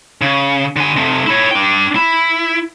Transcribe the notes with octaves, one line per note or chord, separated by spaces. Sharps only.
C#3
D3 G#5
C3 A3
E4 C#5
D4 G5
E4